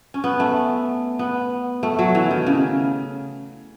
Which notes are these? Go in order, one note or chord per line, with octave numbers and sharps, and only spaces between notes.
C#4
B3
A3
B3
A3
F#3
E3
D#3
C#3